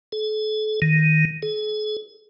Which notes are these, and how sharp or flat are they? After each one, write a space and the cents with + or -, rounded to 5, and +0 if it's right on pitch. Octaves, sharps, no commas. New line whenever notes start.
A4 -40
D#3 +0
G#4 +45